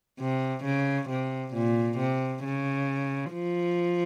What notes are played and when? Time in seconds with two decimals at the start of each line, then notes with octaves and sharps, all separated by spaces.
0.20 C3
0.64 C#3
1.09 C3
1.54 A#2
1.99 C3
2.44 C#3
3.33 F3